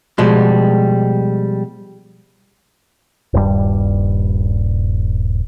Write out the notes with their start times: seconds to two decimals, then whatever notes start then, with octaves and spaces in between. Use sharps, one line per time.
0.18 B2 F3 G3 G#3 F#4
3.33 D#1 G2 G3